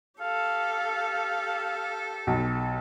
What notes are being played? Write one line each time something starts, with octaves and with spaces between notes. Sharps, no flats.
G4 A4 F5
B1